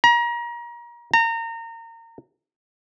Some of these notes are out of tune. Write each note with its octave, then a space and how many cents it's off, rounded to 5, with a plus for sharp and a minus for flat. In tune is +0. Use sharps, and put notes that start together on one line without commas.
A#5 +30
A#5 -30